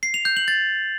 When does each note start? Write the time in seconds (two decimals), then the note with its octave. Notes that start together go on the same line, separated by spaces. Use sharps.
0.03 C7
0.14 F7
0.25 G6
0.37 F#7
0.48 A6